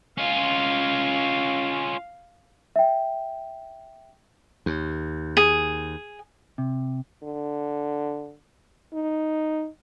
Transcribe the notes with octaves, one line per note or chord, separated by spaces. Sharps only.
C#4 F4 F5
E5 G5
D#2
G#4
C3
D3
D#4